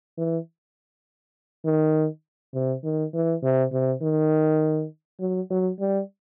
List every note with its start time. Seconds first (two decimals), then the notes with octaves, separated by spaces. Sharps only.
0.17 E3
1.65 D#3
2.54 C3
2.84 D#3
3.14 E3
3.43 C3
3.72 C3
4.02 D#3
5.20 F#3
5.50 F#3
5.80 G3